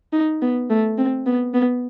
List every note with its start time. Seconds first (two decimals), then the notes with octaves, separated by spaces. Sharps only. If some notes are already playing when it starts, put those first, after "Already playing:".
0.13 D#4
0.42 B3
0.70 A3
0.98 C4
1.27 B3
1.54 B3